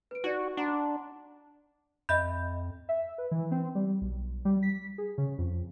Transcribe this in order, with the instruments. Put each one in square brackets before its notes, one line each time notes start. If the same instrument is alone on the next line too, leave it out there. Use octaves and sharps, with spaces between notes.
[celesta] B4 D7
[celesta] D#4 D5 [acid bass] F#4
[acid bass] D4 [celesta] F#5 A#5 C6
[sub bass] F2 [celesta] D#5 E5 B5 [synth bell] G6
[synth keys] E5
B4
E3
C4
G3
B1
G3
B6
G#4
C#3
F2